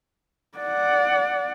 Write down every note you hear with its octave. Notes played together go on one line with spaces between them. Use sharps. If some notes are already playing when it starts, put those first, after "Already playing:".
D5 F#5